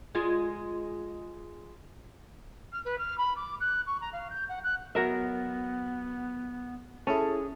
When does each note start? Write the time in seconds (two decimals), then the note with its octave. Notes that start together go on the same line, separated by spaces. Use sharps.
0.15 G#3 F4
2.72 F6
2.85 B4
2.98 F6
3.18 B5
3.36 D6
3.60 F#6
3.86 C#6
4.01 A#5
4.12 F5
4.30 G6
4.48 F#5
4.63 F#6
4.95 F#3 B3 A#4 E5
7.07 C#4 E4 G#4 A4 A5